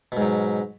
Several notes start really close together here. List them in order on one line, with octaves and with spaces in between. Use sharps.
B2 G#2 F#3